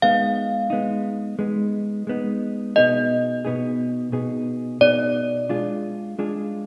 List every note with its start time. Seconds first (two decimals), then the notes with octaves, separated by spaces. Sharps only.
0.02 G#3 B3 D#4 F5
0.70 G#3 B3 D#4
1.39 G#3 B3 D#4
2.07 G#3 B3 D#4
2.76 B2 B3 D#4 G#4 D#5
3.45 B2 B3 D#4 G#4
4.12 B2 B3 D#4 G#4
4.81 B2 B3 D#4 G#4 D5
5.49 G#3 D4 F4 G#4
6.19 G#3 D4 F4 G#4